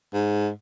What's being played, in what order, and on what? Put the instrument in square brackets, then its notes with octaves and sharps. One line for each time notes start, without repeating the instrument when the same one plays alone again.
[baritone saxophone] G#2